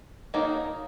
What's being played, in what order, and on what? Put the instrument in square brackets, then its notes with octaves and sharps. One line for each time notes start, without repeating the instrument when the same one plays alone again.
[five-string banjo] D#3 F#3 A#3 D#4